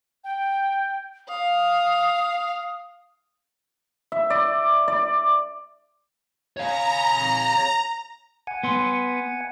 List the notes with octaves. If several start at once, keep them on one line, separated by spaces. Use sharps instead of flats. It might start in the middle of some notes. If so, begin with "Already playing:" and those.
G5
F5 D#6
E5
D5
D5
C#5 F5 A#5
F#5 G#5
B3 C6